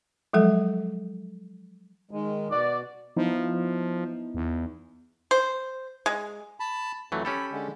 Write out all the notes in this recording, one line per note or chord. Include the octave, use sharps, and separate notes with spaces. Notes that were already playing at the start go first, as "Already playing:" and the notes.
F3 F#3 G#3 A4 E5
D#3 G#3
B2 F#4 D5
F3 B3 D#4 E4
E2
C5
G#3
A5 B5
F2 E3 F#3 A3
C#4 G4 A4 B5
D3 G#3